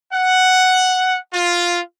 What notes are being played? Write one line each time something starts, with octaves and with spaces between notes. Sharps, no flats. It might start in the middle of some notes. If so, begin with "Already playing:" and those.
F#5
F4